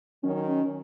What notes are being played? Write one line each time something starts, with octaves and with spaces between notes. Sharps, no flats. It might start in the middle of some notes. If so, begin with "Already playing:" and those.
D#3 F#3 C#4